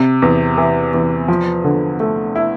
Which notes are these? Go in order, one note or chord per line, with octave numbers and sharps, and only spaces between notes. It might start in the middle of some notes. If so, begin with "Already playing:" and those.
Already playing: C3
E2
E3
E2
F3
D3
A3
E4